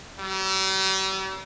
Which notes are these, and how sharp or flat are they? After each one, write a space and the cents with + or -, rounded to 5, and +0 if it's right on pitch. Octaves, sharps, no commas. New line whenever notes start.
G3 -45